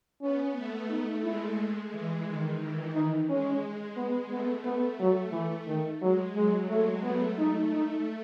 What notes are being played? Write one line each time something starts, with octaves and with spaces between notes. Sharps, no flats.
B3 C#4
A3
D#4
G#3 E4
E3
D#3
E3
D#4
G#3 C#4
G#3 B3
A3 B3
B3
F#3 A3
E3
D#3
F#3 G#3
F#3 G#3
G#3 A3
A3 B3
D#4
D#4